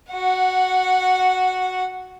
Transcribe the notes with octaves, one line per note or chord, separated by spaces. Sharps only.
F#4 F#5